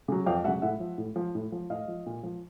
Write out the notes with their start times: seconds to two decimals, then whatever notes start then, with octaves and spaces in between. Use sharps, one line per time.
0.08 C#3 F#3
0.26 F2 F5 G5
0.44 F#3 E5 F#5
0.48 C#3
0.62 A2 E5 F#5
0.80 F3
0.98 A2
1.16 F3
1.35 A2
1.52 F3
1.70 A2 D#5 F5
1.88 F3
2.06 A#2
2.23 F3